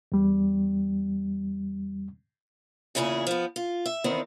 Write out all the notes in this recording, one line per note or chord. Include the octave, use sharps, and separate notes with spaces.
E2 G3
E2 A#2 C#3 E4 G#4
F3 B3
F4
E5
E2 D#3 B3 C4